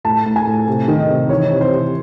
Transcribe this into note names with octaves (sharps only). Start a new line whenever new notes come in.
A2 A5
A2
G#5
A2
C3
D#3
D#5
C3
E3 C#5
C3
C5
C3